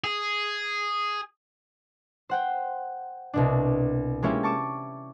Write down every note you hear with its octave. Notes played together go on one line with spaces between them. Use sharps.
G#4
C5 F#5 G5
C2 B2 D4
G#3 A#3 C#4 E4 F4 G4
A5 C#6 D6 E7